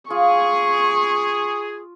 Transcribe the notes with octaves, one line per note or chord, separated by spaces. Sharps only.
F4 G#4 C#6